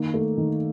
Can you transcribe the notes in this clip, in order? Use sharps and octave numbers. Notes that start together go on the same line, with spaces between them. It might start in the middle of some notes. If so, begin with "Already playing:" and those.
Already playing: D#3 A#3
A3
D#3